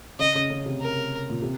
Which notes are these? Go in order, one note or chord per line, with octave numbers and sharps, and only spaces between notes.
C#3 D#5
C#3
C#3
C3
A#4
A#2
C3